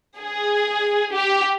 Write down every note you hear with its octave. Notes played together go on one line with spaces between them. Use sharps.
G#4
G4